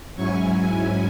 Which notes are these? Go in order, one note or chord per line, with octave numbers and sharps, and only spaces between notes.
G#2 F#3 C#4 E4 G#5 C#6